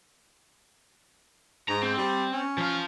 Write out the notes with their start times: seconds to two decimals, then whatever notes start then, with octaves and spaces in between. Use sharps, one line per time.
1.69 G#2 A#5
1.83 C4
1.98 G3
2.32 C#4
2.58 F3 F5